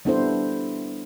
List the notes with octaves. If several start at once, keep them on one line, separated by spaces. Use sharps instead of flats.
G3 B3 D4 E4 A4 C5